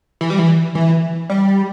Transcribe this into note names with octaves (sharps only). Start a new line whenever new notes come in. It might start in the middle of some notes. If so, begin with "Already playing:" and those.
E3
G3
E3
E3
G3